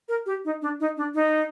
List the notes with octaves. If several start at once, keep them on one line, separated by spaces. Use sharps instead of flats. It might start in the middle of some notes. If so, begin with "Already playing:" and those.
A#4
G4
D#4
D4
D#4
D4
D#4